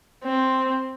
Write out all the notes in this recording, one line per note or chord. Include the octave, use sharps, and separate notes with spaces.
C4